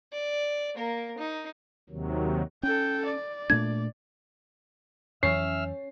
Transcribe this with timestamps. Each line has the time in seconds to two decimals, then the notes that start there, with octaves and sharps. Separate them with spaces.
0.12 D5
0.75 A#3 A#4
1.18 D#4
1.90 D#2 C3 D#3 F#3
2.63 C#4 A4 G5
3.05 D5
3.50 A#2 A3 D4 G#6
5.23 F2 E3 F#3 C#4 E5 E6 F6 C7